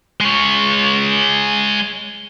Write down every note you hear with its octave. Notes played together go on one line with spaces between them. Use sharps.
G#3 C#5